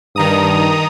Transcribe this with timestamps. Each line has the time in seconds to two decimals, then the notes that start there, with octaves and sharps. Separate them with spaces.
0.16 G2 D#3 A#5 D#6